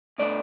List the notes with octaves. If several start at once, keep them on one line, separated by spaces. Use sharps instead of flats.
B2 A3 D4 D5